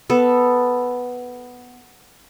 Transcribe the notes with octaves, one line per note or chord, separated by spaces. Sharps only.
B3 A4